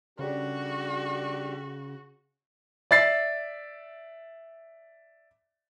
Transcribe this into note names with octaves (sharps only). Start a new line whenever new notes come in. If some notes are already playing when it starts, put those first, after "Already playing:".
C#3 G3 D4 F#4 G4 A4 D5
D5 E5 A6 C7